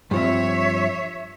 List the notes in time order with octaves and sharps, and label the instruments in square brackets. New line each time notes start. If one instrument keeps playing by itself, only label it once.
[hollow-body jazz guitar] G2 F3 C4 [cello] C#5 E5